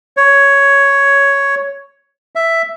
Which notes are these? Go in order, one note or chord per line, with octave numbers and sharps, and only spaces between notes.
C#5
E5